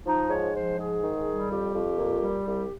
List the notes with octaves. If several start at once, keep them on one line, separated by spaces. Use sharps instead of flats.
F3 D#4
G#2 C#5
F3 C5
G#2 G#4
D#3
G3
F2 G4
F2
A#2
G3
C2 G4